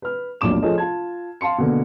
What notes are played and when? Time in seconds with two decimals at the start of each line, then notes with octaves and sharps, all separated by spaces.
0.02 B4 F6
0.41 F1 B1 A#2 D4 D6 E7
0.62 F3 G#4 A4 C#5 D#5
0.78 F4 A5 G#6
1.41 F5 A5 C6 C#7
1.58 B2 D3 A#3